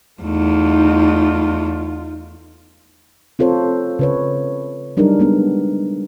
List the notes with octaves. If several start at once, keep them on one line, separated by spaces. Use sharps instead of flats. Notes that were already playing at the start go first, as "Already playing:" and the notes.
E2 A3 D#4 F4
C4 F4 A4 C5 C#5
C#3 B4 C#5
F#3 G3 D4 D#4 G#4 A#4
G#3 B3 D4